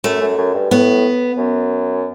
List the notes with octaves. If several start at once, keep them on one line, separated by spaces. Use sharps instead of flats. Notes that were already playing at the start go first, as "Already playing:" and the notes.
F#2 A3
F#2
F#2
G2
A2 B3
F#2